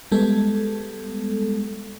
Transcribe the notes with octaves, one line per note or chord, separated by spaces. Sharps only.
G3 G#3 B3 A4